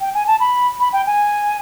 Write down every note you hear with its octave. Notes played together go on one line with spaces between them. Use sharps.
G5
G#5
A5
B5
B5
G5
G#5